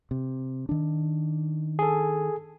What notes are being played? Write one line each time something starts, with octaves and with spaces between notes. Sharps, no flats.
C3
D#3 D4
G#4 A4